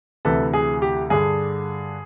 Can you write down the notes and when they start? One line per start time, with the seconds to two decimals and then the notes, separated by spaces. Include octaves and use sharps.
0.25 D2 C3 E3 A4 B4
0.53 G#4
0.82 G4
1.10 G2 D3 G#4